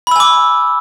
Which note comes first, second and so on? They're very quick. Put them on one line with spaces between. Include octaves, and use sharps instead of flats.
B5 E6 G#5 D6